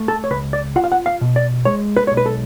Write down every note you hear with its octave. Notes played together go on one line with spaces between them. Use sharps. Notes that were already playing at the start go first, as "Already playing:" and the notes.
Already playing: A3
A4
C#5
C#2 B4
D5
F4 F#5
F5
F#5
F5
B2
D5
G#3 C#5
B4
C#5
B1
B4
A4